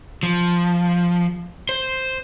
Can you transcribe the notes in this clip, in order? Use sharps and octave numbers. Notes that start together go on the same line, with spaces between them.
F3
C5